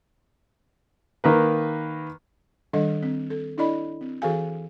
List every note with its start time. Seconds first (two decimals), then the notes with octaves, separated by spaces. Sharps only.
1.24 D#3 A#3 B4
2.73 D#3 G3 D4 A4 D#5
3.03 C4
3.30 A4
3.58 D4 E4 A4 D5 D#5 B5
4.01 C4
4.22 E3 F#4 G#4 A4 F5 G#5